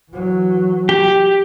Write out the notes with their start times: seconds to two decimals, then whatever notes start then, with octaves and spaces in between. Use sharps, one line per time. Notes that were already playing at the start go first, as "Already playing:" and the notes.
0.11 E3 F#3
0.89 G4